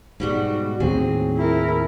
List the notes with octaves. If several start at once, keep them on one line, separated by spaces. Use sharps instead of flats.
G#2 B2 G3 F#4
D#2 A2 F#3 C4 G#4
E4 A#4